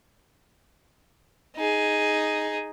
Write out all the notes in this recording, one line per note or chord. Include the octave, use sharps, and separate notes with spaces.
D#4 G#4